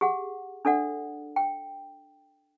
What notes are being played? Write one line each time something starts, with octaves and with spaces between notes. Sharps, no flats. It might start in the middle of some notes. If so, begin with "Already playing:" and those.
G4 G#4 F#5
D4 A4 D5 F#5
G5